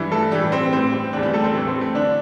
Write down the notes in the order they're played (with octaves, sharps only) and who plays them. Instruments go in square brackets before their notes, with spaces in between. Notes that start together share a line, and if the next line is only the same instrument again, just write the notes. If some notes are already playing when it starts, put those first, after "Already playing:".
Already playing: [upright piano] G2 E3 E4
A3 A4
A2 E3 G3 G4
C4
A2 E3 C4
C4
E2 D3 E3 D4
G3 G4
A3 A4
C4
A2 E3 A3
C4
A3
D3 D4